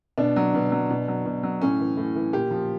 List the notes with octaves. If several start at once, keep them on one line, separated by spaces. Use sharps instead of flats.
B2 D4
F#3
B2
F#3
B2
F#3
B2
F#3
A2 C#4
E3
A2
E3
A#2 G4
F3